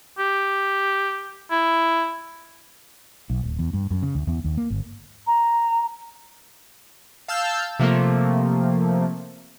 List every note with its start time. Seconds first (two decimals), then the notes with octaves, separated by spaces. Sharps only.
0.18 G4
1.51 E4
3.30 B1
3.43 D1
3.59 E2
3.74 G2
3.91 F#2
4.03 C#3
4.15 D2
4.27 E2
4.44 D#2
4.57 A#3
4.70 G1
5.26 A#5
7.28 F5 A5 E6 F6 G6
7.79 C3 F3 A3 A#3